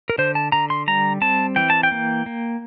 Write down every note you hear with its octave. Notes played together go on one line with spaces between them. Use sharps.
A#4
D3 C5
A5
D3 A#5
C6
G3 A#5
C4 A5
E3 G5
A5
G5
A#3
A#3